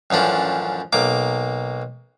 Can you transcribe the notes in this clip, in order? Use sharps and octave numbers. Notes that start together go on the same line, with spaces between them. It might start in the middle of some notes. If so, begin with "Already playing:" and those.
A1 F#2 F3 D4
B1 A#3 D6